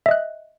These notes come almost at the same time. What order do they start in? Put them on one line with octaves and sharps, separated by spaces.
E5 D#5 F#6